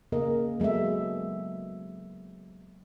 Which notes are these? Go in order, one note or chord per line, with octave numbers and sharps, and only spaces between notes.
C#3 A#3 G#4 A#4 D#5
F#3 G#3 B3 A4 E5